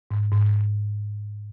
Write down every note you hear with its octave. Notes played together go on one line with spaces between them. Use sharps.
G#2
G#2